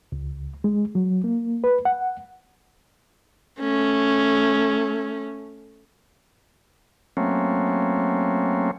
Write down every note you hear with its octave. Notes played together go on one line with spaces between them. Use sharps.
C#2
G#3
F#3
A#3
B4
F#5
A3 C#4
F#3 A3 A#3 C4 C#4